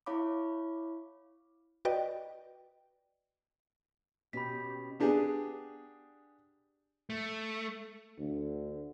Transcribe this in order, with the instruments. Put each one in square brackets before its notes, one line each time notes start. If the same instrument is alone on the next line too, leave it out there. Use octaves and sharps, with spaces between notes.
[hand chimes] E4 C#5 F5 B5 D6
[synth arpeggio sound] F#4 B4 D5 D#5 G5
[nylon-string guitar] B2 [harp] C#4 [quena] G4 [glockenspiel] B5 B6
[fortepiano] B3 D4 G4 G#4
[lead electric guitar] A3
[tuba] D2 [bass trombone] D3